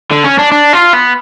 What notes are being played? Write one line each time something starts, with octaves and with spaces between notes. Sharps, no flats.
D3
C#4
D4
D4
F4
B3